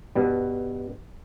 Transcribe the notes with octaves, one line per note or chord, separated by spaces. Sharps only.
G2 B2 G3